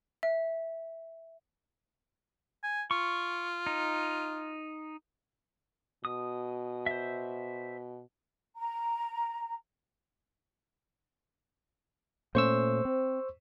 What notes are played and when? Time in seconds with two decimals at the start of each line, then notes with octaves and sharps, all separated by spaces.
0.23 E5
2.63 G#5
2.91 F4 C#6
3.66 D#4
6.05 B2 D#6
6.86 C5 E5
8.55 A#5
12.35 A#2 A3 C#4 C5 C#6 E6
12.85 C4